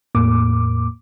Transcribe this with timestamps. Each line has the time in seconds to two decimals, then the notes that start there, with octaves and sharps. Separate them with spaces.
0.15 E2 A2 A#3 D6